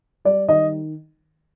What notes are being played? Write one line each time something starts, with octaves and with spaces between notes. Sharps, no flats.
G3 D5
D#3 D#5